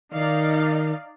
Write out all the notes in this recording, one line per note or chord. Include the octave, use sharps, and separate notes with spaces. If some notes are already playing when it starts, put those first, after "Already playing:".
D#3 D#4 D5 F5